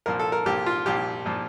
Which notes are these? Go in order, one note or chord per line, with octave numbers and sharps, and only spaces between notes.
C2 A#2 F3 A#4
A4
A#4
C2 A#2 F3 G4
F4
C2 A#2 F3 G4
A#2 F3